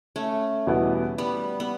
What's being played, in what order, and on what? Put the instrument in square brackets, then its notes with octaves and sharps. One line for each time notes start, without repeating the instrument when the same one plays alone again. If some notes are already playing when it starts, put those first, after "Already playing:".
[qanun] A3 C#4
[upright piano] E2 B2 G3 B3 E4
[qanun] G3 B3
B3